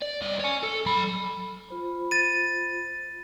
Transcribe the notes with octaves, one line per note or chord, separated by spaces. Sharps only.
D5
C2 D#5
C#5 G#5
A4
F#3 B5
F4 C5 B5
A6 D#7